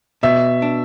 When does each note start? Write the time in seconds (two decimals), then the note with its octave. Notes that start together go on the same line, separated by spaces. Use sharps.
0.23 B2 E5
0.62 D4